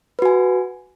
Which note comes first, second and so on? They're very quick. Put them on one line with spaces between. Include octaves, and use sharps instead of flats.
B4 F#4 G#5